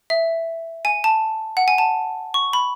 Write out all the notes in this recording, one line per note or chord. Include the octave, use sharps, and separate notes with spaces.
E5
G#5
A5
F#5
G#5
A5
C#6
B5